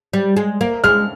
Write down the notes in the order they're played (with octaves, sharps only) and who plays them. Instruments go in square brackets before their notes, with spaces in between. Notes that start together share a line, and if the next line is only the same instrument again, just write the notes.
[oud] G3
G#3
A#3
[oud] G#3 [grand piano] F6